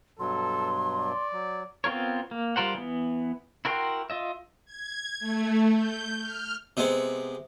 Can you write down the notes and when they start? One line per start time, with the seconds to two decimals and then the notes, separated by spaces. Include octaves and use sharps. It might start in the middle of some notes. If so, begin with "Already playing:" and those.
0.19 G2 B2 F#3 A4 C6
0.99 D5
1.33 F#3
1.84 B3 C4 F4 A#4 C#5
2.31 A#3
2.56 G3 F4 A#4 C5 F#5
2.75 E3 B3
3.65 E4 F#4 A#4 G5 C6
4.10 F4 D#5 E5
4.66 G#6
5.20 A3
5.74 G6
6.21 F6
6.77 C3 G#3 B3